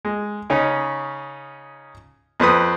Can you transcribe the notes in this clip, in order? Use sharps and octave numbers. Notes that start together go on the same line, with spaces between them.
G#3
C#3 C#4 D#4
F2 C4 B4 D#6